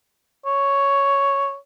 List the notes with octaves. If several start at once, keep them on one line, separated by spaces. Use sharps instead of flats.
C#5